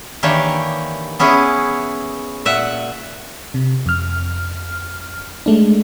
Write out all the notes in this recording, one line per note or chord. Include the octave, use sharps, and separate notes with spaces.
D#3 E3 A#3 D4 G4 C#5
B3 C#4 E4 G#4 C#5
A#2 E5 F#5
C3
F2 F6
G#3 A3 D4